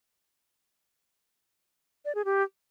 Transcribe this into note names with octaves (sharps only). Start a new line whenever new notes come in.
D5
G#4
G4